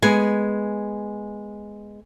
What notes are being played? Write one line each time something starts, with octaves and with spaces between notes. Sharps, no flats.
G#3 B3 G#5